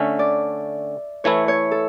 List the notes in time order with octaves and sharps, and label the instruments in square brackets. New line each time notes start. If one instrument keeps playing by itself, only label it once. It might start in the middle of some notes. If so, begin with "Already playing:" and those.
Already playing: [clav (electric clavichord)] D3 A3 C#4 [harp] E5
[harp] D5
[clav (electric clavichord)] E3 A3 E4 [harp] C#5
[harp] C#5
A4